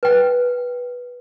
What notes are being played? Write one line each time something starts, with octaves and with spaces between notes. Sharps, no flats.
B4 G5